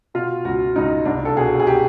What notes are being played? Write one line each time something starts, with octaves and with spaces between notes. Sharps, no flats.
B2 F4
C#2 F#4
C#2 D#4
C2 D4
A4
B2 G#4
G#4
G4